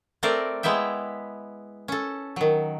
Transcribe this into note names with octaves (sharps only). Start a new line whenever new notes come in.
A3 C4 A4 A#4 C5 D5
G#3 B3 E4 E5 G5
C#4 A4
D#3 F#3